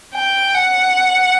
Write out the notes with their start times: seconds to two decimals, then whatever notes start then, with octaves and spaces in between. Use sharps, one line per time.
0.15 G5
0.54 F#5